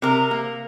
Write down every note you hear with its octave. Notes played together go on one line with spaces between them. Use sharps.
C3 A#4
A#3